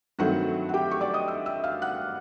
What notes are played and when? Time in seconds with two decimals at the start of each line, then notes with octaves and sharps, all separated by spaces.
0.19 G2 D#3 F#3 A3 C4 F#4 F#5
0.69 F#5
0.74 G4 G5
0.91 C#6
1.01 D5 D6
1.14 D#5 D#6
1.28 E5 E6
1.45 E5 E6
1.64 F5 F6
1.82 F#5 F#6